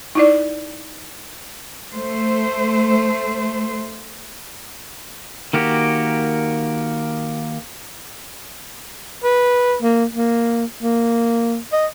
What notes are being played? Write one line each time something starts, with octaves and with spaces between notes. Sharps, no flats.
D#4 E4 D5
A3 C5
D#3 A#3 F#4 G4
B4
A#3
A#3
A#3
D#5